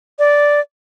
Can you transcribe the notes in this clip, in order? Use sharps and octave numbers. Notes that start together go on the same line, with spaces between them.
D5